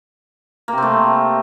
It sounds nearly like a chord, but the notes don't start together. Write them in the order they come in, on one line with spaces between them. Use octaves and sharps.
A#3 C3 C4 A3